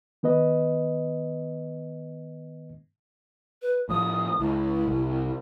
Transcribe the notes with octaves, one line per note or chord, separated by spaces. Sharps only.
D#3 B3 B4 D#5
B4
A2 F3 D#6
C#2 E4
C2